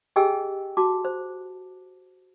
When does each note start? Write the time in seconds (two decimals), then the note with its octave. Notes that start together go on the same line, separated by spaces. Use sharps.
0.16 G4 G#4 D#5 G5 G#5 E6
0.77 F#4 A5 D6
1.05 C5